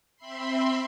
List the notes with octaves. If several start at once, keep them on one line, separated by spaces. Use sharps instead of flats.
C4 E5 B5 C6